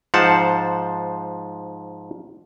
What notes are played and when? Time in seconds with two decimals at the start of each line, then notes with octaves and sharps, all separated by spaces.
0.14 G#2 F3 C5 F#5 A5